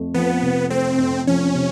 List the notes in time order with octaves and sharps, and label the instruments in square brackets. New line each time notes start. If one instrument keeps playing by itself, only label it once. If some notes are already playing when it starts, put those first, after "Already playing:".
Already playing: [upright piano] F2 A3
[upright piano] F3 [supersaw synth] B3
[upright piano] C3
[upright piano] A3 [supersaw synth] C4
[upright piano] F2
[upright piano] F3 [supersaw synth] C#4
[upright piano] C3